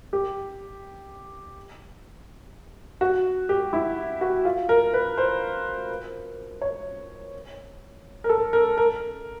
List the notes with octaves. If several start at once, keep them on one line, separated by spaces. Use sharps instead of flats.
G4
F#4
G4
E4
F#4
F4
A#4
B4
C5
C#5
A#4
A4
A#4
A#4